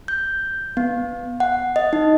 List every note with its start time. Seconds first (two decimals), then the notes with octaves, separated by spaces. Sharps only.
0.08 G6
0.77 B3
1.40 F#5
1.76 D#5
1.93 D#4